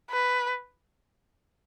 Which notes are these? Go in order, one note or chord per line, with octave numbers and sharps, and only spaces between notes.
B4